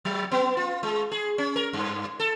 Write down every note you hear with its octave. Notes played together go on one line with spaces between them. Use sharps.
F#3
B3
F4
G#3
G#4
C#4
A#4
G2
A4